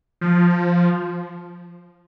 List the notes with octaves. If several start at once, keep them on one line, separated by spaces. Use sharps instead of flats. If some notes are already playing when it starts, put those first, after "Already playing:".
F3